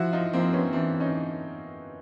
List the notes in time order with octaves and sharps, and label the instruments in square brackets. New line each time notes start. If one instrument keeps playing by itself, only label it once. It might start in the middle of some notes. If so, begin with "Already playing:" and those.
Already playing: [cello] F3 [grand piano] E4 F#4
[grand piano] D#4 F4
[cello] F3 [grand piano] A#3 C4
[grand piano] B3 C#4
[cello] E3 [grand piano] C4 D4
[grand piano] C#4 D#4